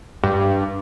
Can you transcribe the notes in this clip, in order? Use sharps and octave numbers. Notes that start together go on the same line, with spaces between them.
G2